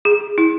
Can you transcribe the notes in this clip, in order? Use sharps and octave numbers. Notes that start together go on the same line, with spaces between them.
G#4
E4